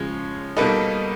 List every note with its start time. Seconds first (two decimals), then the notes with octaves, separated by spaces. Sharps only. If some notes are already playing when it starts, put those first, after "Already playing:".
Already playing: C#3 F3 G#3 C#5
0.57 B2 G3 A#3 D#4 A4 B4